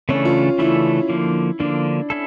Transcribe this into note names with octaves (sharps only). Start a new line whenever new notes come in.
C#3 E3 A3 C#4 D4 A4
F4
C#3 E3 A3 D4 E4 A4
D3 F3 A#3
D3 F3 A#3 D4
C#4 E4 A4